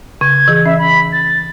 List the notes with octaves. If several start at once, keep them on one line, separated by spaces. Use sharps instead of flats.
C#3 G#6
E3 G#4
C#4 E5
B5
A6